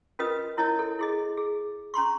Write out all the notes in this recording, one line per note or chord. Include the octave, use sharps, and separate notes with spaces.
C#4 F4 A#4 B4 D#5 D#6
C#4 E4 A#4 C#5 D#5 A5
A4
E4 G#4 D#5
G#4
C#4 A#5 C6 C#6